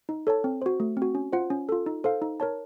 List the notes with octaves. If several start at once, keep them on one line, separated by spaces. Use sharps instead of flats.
D#4
A4 C#5 A5
C4
F#4 C5
A3
C4 F#4
C#4
F4 C5 F#5
C#4
F4 A4
D#4
A4 C5 F5
D#4
A#4 C#5 A5